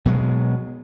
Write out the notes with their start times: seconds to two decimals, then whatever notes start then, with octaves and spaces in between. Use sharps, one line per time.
0.06 B2 F#3 G#3